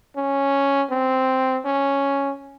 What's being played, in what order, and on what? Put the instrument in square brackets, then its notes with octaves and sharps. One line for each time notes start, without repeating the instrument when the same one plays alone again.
[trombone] C#4
C4
C#4